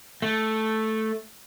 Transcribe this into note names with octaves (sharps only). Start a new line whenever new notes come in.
A3